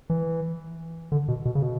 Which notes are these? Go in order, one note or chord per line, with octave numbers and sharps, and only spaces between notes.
E3
D3
B2
B2
C#3
B2